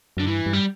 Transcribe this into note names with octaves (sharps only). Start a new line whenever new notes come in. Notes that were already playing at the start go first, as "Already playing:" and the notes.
F#2 D3
G2 E3
G2
G3